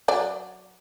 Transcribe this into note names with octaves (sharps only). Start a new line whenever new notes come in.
F#3 D5